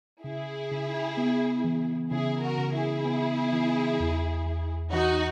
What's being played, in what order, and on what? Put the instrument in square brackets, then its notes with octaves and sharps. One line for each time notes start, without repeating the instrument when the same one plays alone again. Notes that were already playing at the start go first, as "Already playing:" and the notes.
[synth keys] C#3 [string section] E4 G#4
[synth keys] C#3
B3
E3
[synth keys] C#3 [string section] E4 G#4
[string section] F#4 A#4
[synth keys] C#3
[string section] E4 G#4
[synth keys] B3
E3
E2
E2
[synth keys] E3 [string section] D#4 F#4